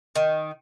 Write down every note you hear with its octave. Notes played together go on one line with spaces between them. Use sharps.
D#3